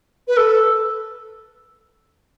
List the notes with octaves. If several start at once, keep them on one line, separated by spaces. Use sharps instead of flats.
B4
A4